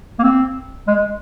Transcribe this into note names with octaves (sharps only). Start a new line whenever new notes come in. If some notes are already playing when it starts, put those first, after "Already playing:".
A#3
C4
G#3